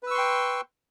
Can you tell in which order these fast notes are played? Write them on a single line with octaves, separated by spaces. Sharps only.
B4 E6 C#6 C6 G5